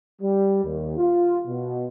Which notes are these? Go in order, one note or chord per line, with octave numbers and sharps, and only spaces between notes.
G3
D#2
F4
B2